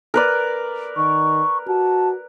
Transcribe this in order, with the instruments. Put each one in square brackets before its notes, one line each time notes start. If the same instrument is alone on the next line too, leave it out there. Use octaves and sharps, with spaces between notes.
[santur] A#4 B4 D5
[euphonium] D#3 [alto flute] C#6
[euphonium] F#4 [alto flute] A5